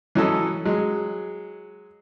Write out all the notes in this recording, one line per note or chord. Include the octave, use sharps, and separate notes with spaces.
E3 F#3 C#4 A4 D#5
F#3 G#3